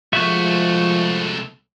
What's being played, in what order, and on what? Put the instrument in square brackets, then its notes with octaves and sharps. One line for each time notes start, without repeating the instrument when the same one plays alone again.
[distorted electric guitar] C2 A3 [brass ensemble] F3 G#3 [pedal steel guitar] F#4 E5 C#6